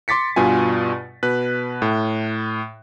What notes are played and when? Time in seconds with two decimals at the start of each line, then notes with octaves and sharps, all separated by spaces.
0.08 C6 D6 A6 B6 C#7
0.36 G2 B2 F4 G#5
1.23 B2 B4 F#6
1.82 A2